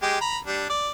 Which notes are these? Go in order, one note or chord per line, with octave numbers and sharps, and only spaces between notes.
G#3 G4
A#5 B5
G3 D4
D5